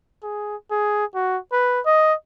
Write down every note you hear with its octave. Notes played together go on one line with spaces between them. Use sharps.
G#4
G#4
F#4
B4
D#5